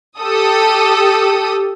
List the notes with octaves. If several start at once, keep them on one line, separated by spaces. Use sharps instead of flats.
G4 A4 D#6